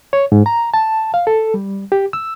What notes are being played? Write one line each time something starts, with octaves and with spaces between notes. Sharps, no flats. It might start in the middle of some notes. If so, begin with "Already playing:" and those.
C#5
G#2
A#5
A5
F5
A4
G3
G4
E6